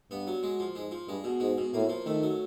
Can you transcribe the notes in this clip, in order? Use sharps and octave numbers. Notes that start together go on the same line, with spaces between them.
G2 B3
F#3
G#3
F3
G#2 G#3
F3
G2 G#3
B2
G#2 G#3
B2
A2 A#3
F3
D#3 A3
F#3